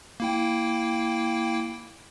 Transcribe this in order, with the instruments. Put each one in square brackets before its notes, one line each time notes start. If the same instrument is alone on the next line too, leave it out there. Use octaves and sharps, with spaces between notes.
[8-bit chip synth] A#3 E4 G5